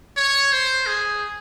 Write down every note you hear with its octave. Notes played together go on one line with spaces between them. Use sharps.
C#5
C5
G#4